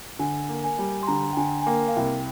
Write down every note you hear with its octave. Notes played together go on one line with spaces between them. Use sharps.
D3 G#5
A#3
G#5
G3
C6
D3 A#5
G5
D3 G#5
G#5
A#3 G5
F5
C2 G5